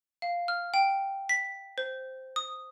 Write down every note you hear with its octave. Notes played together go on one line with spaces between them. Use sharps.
F5
F6
G5
B6
C5
D#6